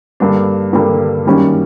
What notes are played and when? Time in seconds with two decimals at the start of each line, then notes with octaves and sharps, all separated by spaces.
0.20 G2 D3 G3 A#3 D4
0.73 G2 D3 G3 A#3 D4
1.25 F#2 D#3 G3 A#3 C#4